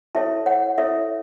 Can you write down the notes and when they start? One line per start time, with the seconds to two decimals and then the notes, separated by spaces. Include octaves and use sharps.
0.15 E4 A4 C#5 E5 A5
0.46 C#5 F#5
0.78 E4 A4 C#5 E5